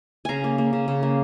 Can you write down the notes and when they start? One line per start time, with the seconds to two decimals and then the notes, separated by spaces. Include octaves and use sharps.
0.25 C#3 F5 G#5 A#5
0.44 A#3
0.58 A#3
0.73 C#3
0.88 C#3
1.03 A#3